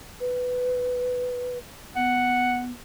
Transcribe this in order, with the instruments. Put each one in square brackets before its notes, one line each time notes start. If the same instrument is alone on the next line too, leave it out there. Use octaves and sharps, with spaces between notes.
[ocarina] B4
[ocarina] B3 [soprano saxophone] F#5